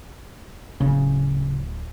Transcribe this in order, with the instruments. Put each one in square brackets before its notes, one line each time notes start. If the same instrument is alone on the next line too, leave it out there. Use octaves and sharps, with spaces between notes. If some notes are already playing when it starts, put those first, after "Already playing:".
[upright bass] D1 [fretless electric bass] C#3